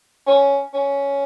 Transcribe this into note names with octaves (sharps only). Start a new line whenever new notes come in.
C#4
C#4